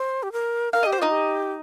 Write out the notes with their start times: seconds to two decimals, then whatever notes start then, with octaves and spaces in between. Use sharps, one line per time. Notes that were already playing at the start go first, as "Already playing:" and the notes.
Already playing: C5
0.23 G4
0.32 A#4
0.73 A#4 F5
0.83 G4 D#5
0.92 C5
0.99 D#4 F4 D#5
1.10 G4